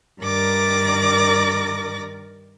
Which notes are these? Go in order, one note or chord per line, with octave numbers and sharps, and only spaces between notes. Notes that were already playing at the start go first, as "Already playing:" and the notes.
G2 D#3 A#4 D5 D6 A#6